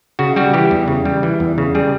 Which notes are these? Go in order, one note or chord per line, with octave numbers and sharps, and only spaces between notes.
C#3 F#4
G3 F#4
E3 G4
E2
C#3
G3
E3
E2
C#3
G3 G#4